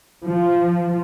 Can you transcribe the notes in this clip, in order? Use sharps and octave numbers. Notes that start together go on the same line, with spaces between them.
F3